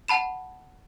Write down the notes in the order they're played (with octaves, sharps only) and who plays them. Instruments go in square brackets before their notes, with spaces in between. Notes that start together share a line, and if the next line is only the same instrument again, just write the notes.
[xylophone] F#5 A5 B5 E7